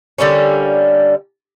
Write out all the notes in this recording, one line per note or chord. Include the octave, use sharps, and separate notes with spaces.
D3 G3 A#3 C#4